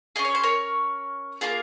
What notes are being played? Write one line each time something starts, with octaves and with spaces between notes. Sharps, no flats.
C#4 G#4 D#5
C#5
C5
A#4 C#5
A#3 F4 G#4 A#4